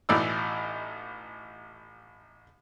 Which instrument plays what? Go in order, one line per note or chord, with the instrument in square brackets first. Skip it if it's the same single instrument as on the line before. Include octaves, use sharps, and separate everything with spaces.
[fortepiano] A1 B2 E3 D#4 D5 E6